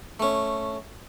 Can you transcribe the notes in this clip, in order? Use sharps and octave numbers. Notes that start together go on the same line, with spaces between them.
A3 C#4